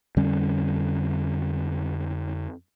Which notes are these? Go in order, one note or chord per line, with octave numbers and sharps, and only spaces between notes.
F2 D3 G3 C#4